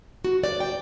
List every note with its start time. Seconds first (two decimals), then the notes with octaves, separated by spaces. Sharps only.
0.25 F#4
0.44 D5
0.60 G5